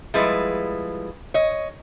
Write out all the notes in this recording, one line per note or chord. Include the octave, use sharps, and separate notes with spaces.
F3 G3 G#3 E4 B4
C#5 D#5